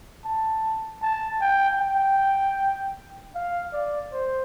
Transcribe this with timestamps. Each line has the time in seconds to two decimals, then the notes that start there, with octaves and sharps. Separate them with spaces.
0.25 A5
1.02 A5
1.41 G5
1.80 G5
3.35 F5
3.73 D5
4.13 C5